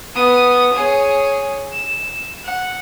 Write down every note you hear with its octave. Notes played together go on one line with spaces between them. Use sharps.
B3 D#6
G#4 C#5
E7
F#5